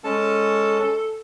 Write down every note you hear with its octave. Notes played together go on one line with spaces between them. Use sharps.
G#3 C#4 A4 A5